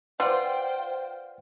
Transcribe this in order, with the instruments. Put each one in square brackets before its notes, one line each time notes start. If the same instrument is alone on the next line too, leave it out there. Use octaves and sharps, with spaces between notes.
[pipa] F4 [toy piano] B4 C6 [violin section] C5 G5 [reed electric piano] D5 F#5